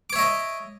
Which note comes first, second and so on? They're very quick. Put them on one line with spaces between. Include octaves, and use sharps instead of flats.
D6 C#5 E5 D#5